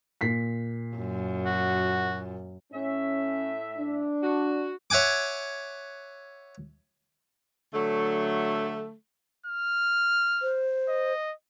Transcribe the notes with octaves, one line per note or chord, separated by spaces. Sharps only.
A#2 B6 C7
F#2
F#4
A2 C#4 E5
D4
F#4
C#5 E5 F#5 G#5 D6
D3 F#3 A3
F6
C5
D#5